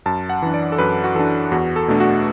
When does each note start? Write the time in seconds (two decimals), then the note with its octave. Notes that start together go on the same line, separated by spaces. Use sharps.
0.06 F#2 A5
0.30 F#5
0.42 E3 D4
0.54 D5
0.72 A4
0.78 F#2 B4
1.04 F#4
1.15 E3 D4 A4
1.52 E2 F#4
1.76 A4
1.88 B2 A3 D4
2.00 F#4